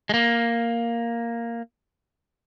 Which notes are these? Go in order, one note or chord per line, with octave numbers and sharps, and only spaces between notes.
G#3
A#3